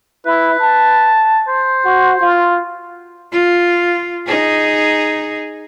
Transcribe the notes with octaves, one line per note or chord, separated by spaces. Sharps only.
E4 B4
A5
C5
F#4
F4
F4
D#4 G#4